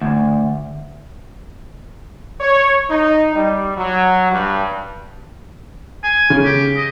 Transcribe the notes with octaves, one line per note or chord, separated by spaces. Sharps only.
D2
C#5
D#4
G3
F#3
G2
G#5
C#3
G4
D#5